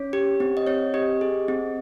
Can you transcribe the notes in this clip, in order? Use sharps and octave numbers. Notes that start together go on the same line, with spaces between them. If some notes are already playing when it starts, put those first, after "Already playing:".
Already playing: C#4 C#5
G4
C4
D#5
C4 C#5
G4 D#5
G#4
C4